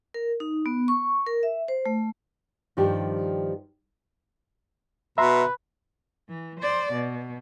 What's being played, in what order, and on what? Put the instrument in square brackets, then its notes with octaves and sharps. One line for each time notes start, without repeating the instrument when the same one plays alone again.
[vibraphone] A#4
D#4
B3
C#6
A#4
E5
C5
A3
[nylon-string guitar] G2 D#3 F3 D4 G4
[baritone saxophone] B2 [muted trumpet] B4 [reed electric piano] E5 A#5 C6
[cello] E3
C5 D5
B2